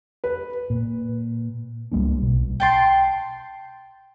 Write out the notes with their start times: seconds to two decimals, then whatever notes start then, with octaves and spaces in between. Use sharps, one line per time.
0.24 B4
0.70 A#2
1.92 C#2 G3 A#3 D4
2.22 B1 B2
2.60 G5 A5 C6